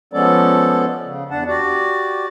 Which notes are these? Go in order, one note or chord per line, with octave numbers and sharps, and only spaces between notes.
F3 G#3 B3 C#4 A4 D5
C#3
E2 D4 F#5 A5
F#4 G4 D5